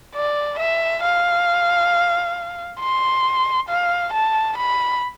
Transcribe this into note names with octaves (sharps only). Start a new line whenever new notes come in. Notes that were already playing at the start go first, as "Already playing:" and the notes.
D5
E5
F5
C6
F5
A5
B5